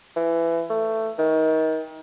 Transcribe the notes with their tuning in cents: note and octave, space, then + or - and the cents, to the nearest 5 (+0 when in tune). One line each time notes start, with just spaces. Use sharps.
E3 +20
A3 +15
D#3 +30